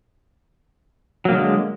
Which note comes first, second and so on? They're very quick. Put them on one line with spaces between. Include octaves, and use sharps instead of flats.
F#3 A#3 D3 G#3